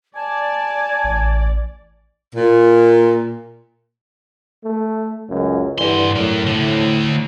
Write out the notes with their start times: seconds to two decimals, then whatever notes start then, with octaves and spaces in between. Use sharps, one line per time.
0.16 D5 G#5 A5
1.04 A1
2.34 A#2
4.64 A3
5.30 C#2 F#2 C#3
5.78 G2 D3 E3 G3 C6
6.16 A2 F#3 A#4
6.47 D2 D3